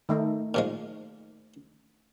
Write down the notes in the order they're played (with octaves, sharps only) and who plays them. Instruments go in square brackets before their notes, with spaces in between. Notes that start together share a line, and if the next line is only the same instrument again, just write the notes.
[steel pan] D#3 A3 D#4
[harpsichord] A#2 F3 G#3